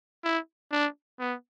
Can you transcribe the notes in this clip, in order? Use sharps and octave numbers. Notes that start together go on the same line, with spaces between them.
E4
D4
B3